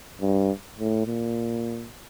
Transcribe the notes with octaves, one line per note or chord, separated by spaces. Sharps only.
G2
A2
A#2